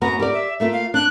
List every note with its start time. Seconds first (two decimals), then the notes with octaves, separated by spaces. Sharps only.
0.01 F#2 B3 F#4 A#5
0.20 G4 A#4 D5
0.34 E5
0.60 A3 A#3 F4 E5
0.72 F5
0.94 D4 F#6